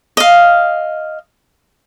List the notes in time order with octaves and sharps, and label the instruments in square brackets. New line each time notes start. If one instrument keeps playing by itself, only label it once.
[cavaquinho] D#5 F5